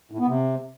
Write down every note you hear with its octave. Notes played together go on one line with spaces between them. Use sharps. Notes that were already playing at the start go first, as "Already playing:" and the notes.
A2
B3
C3